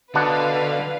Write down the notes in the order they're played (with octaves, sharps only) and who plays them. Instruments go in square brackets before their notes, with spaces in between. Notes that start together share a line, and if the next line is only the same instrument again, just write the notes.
[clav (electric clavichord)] B2 D4 F#5 [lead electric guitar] D3 [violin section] B4 F5